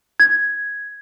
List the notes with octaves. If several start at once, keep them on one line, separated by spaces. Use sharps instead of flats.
G#6